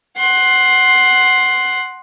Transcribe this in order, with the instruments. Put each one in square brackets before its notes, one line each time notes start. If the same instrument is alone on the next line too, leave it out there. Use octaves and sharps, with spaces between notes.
[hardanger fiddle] F#5 C6